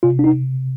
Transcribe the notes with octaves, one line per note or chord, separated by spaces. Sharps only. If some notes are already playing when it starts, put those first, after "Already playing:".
C3 F4
D4
D#4